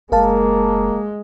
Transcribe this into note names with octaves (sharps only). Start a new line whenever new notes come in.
F#1 G#3 A#3 A#4 F5 A5